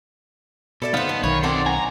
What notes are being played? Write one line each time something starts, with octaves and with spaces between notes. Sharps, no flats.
B2 A4 D5 E5
F#2 D3 B3 D#4 C5 F5
A2
B1 D#3 B4 C#5
C4 A4 C5 D5 F#5
G#5 A#5